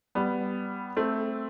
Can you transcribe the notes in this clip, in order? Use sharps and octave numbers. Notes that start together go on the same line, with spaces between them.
G3 B3
A3 C4